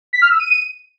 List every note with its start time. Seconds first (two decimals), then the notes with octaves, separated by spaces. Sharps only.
0.13 B6
0.22 F6
0.30 E6
0.39 D#7